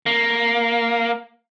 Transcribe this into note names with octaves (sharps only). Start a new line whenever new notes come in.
A#3